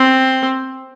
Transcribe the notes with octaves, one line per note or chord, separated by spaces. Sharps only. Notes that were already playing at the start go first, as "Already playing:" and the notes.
Already playing: C4